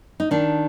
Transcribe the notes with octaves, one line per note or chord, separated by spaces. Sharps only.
D#4
D#3 D4